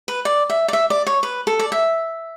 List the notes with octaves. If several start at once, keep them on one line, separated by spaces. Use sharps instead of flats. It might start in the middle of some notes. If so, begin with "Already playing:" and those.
B4
D5
E5
D5
E5
D5
C#5
B4
A4
D5
E5